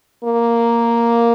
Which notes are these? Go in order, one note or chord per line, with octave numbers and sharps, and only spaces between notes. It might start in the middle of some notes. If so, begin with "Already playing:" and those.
A#3